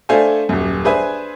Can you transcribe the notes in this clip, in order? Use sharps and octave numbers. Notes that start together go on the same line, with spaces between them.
A3 D4 A4 C5 F5 G#5
D#1 F#2
D4 G#4 B4 C5 E5 G#5